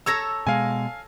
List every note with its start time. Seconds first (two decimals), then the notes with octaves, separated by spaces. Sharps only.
0.06 A4 C#5 A#5 E6 G#6 A#6
0.47 B2 G#3 F5 G#5